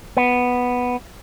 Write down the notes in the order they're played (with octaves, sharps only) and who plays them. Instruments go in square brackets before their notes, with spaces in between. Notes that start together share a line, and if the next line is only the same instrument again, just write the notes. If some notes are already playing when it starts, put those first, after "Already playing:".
[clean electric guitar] B3